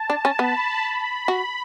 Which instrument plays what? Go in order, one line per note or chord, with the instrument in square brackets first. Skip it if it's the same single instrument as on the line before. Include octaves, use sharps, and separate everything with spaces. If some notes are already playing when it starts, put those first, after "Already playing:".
Already playing: [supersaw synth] A5
[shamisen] D4
C#4
[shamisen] B3 [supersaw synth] B5
[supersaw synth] B5
[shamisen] F#4